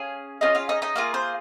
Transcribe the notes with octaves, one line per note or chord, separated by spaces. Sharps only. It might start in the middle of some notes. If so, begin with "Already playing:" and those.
Already playing: C#4 G#4 F5
C#4 D#4 F4 G#4 D#5
F4 F5
D#4 D#5
D#4 D#5
A#3 F4 G#4 A#4
C5